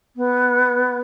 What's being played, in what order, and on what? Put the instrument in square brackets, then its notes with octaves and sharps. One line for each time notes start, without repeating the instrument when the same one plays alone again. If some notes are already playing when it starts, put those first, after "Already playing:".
[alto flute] B3